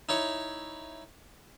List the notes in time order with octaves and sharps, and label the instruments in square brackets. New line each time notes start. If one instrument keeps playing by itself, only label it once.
[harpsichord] D#4 E4 C#5